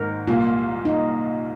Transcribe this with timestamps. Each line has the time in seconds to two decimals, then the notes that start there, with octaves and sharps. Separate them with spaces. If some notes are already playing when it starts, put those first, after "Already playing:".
Already playing: G#1 G#2 D#3 A#4
0.27 C2 A#2 A#3 F4
0.85 D#4